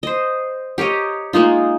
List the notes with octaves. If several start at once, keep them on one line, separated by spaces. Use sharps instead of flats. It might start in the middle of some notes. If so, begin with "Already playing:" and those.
C5 D#5
G4 A#4 C#5 D#5
G#3 A#3 D#4 F4